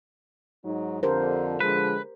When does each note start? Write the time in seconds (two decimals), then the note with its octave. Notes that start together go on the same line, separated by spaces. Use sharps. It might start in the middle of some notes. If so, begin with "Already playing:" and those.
0.64 G#2 F#3 D#4
1.03 F2 D3 G4 A#4 C5
1.60 D3 F3 G#3 B4